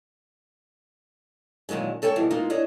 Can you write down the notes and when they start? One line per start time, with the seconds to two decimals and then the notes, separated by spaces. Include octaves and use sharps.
1.69 A#2 D3 D#3 F#3 G#3
2.02 G#2 A4 C#5 G5 A5
2.16 B2 E3 F3 G3
2.31 G#3 A#3 D#4 F4
2.50 D4 G#4 C#5 D#5 E5